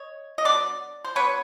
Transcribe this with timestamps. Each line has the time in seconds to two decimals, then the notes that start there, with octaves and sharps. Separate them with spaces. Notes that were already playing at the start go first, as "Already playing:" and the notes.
Already playing: C#5 D#5
0.38 D#5
0.45 F#3 B3 D4 D5
1.05 C5
1.15 F#3 B3 D4 B4 C#5